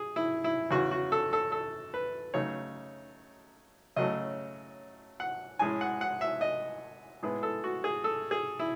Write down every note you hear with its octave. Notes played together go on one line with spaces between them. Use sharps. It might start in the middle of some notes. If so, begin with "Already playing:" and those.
Already playing: G#4
E4
E4
E2 C#3 E3 F#4
F#4
A4
A4
A4
B4
C#3 F#3 A3 D#4 C#5
C#3 F#3 A3 D#5
F#5
A2 G#3 C#4 E4 G#5
F#5
F#5
E5
D#5
A2 G#3 B3 E4
A4
F#4
G#4
A4
G#4
E4